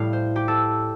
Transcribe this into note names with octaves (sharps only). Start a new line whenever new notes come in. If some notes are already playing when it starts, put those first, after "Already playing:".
Already playing: A2 G3 F5
C5
G4
A4